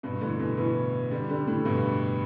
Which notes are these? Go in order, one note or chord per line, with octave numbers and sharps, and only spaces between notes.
G2 B2
A2 D3
B2 E3
B2 E3
D3 G3
D3 G3
A2 D3
G2 B2